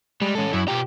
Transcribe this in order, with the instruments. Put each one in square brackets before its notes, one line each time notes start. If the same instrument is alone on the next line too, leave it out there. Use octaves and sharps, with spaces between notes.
[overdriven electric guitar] G3 [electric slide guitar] G#3
[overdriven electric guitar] C#4 A4
[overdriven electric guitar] F#2 [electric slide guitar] E4
[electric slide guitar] B2 F4 A#5 [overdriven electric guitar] G4